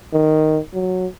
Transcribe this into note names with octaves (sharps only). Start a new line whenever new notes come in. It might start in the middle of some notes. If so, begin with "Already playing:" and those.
D#3
F#3